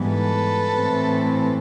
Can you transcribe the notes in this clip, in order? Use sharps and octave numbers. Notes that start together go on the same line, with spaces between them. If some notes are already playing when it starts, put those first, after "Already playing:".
Already playing: G#2 E3 G3 B3
A4 B4
A2 E3 A3 C4